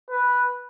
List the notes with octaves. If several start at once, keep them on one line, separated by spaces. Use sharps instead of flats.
B4